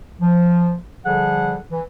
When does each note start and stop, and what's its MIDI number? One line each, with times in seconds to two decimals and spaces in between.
0.20 0.75 53
1.05 1.56 50
1.05 1.56 53
1.05 1.56 55
1.05 1.56 68
1.05 1.56 69
1.05 1.56 78
1.71 1.82 52